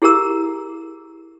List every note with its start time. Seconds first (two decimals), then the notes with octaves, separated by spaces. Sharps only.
0.02 E4 G4 G#4 A#4 A#5 E6